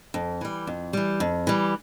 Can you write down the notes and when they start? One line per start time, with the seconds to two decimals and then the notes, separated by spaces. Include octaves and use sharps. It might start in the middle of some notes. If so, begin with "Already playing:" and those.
0.14 F2
0.41 E3 G3
0.67 F2
0.93 E3 G3
1.20 F2
1.47 E3 G3